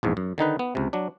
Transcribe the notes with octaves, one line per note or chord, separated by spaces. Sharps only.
A#1 E2 G#2
F#2
D3 D#3 D#4 B4
B3
C#2 C3
F#3 D4